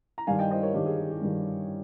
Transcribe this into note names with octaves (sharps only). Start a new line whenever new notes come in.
A#5
G2 D#3 G3 F5 G#5
D#5 G5
C5 D#5
A#4 C#5
G2 D#3 G3 G4
G#4
G#4
G4
G2 D#3 G3